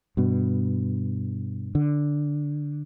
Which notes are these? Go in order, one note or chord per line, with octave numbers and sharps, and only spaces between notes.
G2 B2
D3